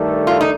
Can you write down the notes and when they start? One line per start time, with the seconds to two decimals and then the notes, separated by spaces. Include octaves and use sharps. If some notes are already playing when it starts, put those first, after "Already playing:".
Already playing: G2 D#3 A3 D4 A4
0.27 F4
0.41 D#4